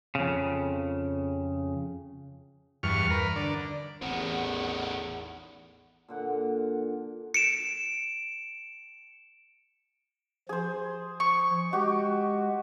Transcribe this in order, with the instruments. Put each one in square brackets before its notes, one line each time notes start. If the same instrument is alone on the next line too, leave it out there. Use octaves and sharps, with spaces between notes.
[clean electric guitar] F2 C#3
[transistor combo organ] E2 G2 C#6 F6
A#4 B4
D3 D5
[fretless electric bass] A1 C4 [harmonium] E2 [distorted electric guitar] A2 D#3 [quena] F#5
[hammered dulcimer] A#2 D3 F#5
[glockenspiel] C#7 D7 E7
[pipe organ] F3 [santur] G#4 C5
[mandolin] C#6
[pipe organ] G#3 [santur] F#4 G4